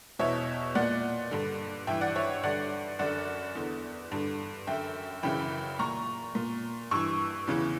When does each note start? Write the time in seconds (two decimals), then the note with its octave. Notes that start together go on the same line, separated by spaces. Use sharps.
0.19 E2 B2 C#5 E5
0.75 A#2 D5 F#5
1.31 G2 D3
1.87 G2 E3 E5 G5
2.01 D5 F#5
2.16 C#5 E5
2.43 G2 D3 D5 F#5
2.99 F#2 D3 D5 F#5
3.55 E2 D3
4.12 G2 D3
4.67 F#2 D3 E5 G5
5.23 F#2 C#3 E3 G5 B5
5.79 A#2 A#5 C#6
6.35 A#2
6.91 G2 E3 C#6 E6
7.47 E2 C#3 E3